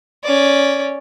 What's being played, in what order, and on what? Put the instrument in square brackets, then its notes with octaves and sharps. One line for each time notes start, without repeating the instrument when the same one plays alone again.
[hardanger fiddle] C#4 D5